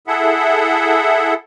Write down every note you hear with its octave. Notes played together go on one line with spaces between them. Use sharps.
E4 G#4 A4 E5 F#5